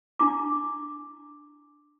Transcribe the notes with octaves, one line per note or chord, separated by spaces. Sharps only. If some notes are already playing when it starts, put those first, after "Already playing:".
D4 E4 D6